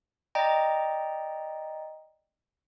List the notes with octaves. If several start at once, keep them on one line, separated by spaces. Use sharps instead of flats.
D5 D#5 G5 A#5